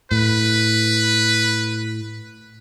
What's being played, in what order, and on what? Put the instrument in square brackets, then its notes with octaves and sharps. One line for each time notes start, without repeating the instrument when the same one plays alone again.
[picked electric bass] A2 [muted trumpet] B4